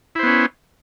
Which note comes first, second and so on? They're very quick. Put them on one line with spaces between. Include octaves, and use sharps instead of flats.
E4 C5 B3 C#4